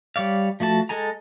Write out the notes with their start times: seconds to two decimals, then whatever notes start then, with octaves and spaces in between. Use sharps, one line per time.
0.16 G3 C#5 D5 F5
0.60 F3 A3 F#4 A5
0.89 G#3 A4 G#5 A#5